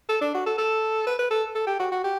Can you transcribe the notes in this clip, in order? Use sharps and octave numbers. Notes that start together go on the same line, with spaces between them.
A4
D4
F#4
A4
A4
B4
B4
A4
A4
G4
F#4
F#4
G4